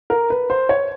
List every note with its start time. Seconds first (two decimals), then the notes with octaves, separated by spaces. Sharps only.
0.10 A#4
0.30 B4
0.50 C5
0.69 C#5